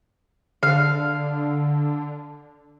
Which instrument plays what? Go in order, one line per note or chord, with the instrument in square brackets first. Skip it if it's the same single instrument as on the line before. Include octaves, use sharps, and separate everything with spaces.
[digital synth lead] D3 [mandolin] F5